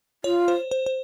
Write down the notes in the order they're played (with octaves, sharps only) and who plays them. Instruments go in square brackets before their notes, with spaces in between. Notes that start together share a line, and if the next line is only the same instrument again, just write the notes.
[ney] F4 [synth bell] C#5
[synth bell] C5
C5
C5